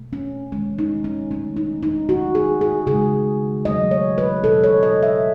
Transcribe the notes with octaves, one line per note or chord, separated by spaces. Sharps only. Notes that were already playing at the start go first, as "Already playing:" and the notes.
Already playing: B2 A3
C#4
D#3 G#3 C#4
D#4
C#4
D#3 A3 C#4
D#4
D#4
D#3 A3 F#4
G#4
G#4
C#3 G#3 G#4
D#3 F#3 A3 D#5
C#5
B4
B2 F#3 A3 A4
C#5
D#5
E5